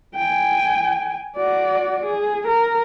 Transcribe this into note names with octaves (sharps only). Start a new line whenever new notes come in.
G5 G#5
F#4 D5
G#4
A#4